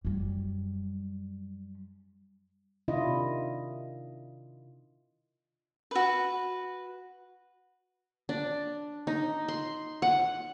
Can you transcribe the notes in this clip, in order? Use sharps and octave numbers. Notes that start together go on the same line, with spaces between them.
F#2 G3
C3 D#3 D4 E4 F4 D#5
F#4 B4
D4
D#4
C6
F#5